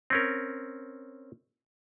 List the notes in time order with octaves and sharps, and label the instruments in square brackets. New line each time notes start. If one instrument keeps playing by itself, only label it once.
[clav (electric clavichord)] C4 C#4 A#4